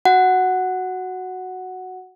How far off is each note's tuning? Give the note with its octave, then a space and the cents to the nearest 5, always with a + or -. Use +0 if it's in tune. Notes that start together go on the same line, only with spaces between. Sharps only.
F#4 +0 F#5 +0